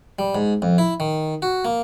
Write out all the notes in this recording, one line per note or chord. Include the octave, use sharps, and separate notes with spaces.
G3
G#2
F2
E4
D#3
F#4
A#3